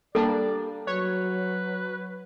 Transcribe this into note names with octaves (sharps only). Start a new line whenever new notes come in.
G3 A#3 D4 A4 D5
F#3 B4 C#5